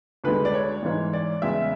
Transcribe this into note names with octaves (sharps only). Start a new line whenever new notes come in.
D2 D3 G#3 B4
D5
C#5
G#2 E3 G#3
D5
E2 C#3 G#3 E5